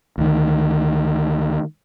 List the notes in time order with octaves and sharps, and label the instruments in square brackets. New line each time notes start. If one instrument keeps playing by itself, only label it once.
[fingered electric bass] D2 D#3